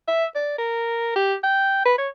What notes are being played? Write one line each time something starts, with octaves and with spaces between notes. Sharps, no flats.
E5
D5
A#4
G4
G5
B4
C#5